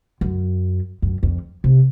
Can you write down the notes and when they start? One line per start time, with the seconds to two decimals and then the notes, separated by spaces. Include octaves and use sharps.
0.21 F#2
1.02 F#2
1.23 F2
1.64 C3